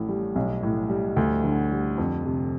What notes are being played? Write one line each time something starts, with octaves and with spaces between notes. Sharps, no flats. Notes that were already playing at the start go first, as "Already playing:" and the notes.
Already playing: A1 A2
G3
B1
A2
G3
D2
D3
G3
F2
C3